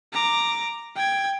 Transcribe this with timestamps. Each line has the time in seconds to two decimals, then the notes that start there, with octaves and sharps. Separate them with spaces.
0.12 A#5 D6
0.96 G5 G#6